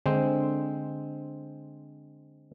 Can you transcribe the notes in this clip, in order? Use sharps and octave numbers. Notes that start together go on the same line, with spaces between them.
D3 G#3 C4 C5